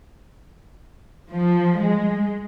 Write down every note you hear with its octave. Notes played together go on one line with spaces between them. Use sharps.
F3
G#3